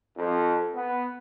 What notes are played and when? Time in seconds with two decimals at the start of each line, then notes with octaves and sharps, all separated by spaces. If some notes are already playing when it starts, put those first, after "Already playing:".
0.16 F2
0.74 B3